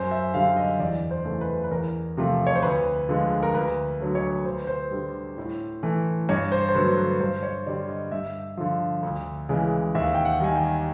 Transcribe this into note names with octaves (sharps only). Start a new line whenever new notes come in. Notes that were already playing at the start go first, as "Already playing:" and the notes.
Already playing: F#2 C5
E5
D3 G3 F5
D#5
E2 D5
C5
C#3 E3 A3
B4
B4
E2 A#4
C3 F3 A3
C#5
C5
D2 B4
D3 F3 G#3
A#4
D2 B4
D3 F#3 A3
C#5
D2 C5
B4
C5
D3 G3
A2
E3 A3
G2 C#5
C5
C5
D3 F#3 A3 B4
B4
G2 C5
C#5
D3 G3 D5
D#5
G2 E5
D3 F3
D2
C#3 E3 G#3
D#2 E5
G5
F#5
D#3 G3 G#5
G5